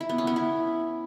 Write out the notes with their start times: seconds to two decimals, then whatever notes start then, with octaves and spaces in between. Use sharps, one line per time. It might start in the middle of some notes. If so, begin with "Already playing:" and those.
0.01 E4
0.09 B3
0.18 C#4
0.27 B3
0.36 E4